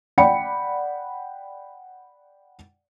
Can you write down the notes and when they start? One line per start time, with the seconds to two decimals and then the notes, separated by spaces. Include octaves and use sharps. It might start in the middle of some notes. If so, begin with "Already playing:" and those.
0.18 D5 F#5 G5 B5 C#7